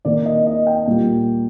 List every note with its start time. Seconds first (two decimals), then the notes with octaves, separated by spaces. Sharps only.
0.05 D#3 A#3 D5
0.26 D#5
0.46 D#5
0.67 G5
0.87 A#2 G3 A#3